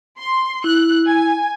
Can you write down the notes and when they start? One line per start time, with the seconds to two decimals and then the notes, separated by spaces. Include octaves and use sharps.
0.18 C6
0.64 E4 F#6
1.07 G#5